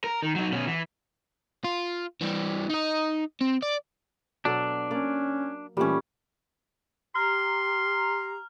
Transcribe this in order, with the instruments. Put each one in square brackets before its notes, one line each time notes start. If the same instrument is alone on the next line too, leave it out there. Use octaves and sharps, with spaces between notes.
[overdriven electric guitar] A#4
D#3
F#3 D#4
B2 C#4
E3
F4
E3 G3
D#4 D#5
C4
D5
[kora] B2 F#3 A4 [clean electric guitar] D4
[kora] A#3 D5 [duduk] C#4
[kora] A#2 A3 [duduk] E3 [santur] G3 C#4
[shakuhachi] G4 [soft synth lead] A#5 [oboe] C6 [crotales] F6